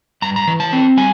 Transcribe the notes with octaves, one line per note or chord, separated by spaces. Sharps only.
G2 A#5
A#5
E3
A5
C4
G3 G#5